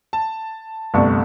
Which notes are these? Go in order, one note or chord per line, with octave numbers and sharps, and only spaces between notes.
A5
G1 C2 A3 A5 C#6